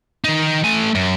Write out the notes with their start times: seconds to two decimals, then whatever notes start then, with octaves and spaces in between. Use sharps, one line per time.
0.24 D#3 D#4
0.64 A3 G#5
0.95 F#2